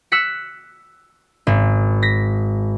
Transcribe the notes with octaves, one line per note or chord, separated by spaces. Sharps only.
E6 F#6 B6 C#7
G#1
A#6 B6